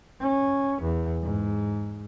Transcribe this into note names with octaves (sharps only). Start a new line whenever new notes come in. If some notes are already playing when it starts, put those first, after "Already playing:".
C#4
E2
G#2